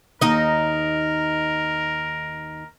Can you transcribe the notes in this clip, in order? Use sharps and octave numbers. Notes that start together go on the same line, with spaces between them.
D#2 D#4 A#4 D#5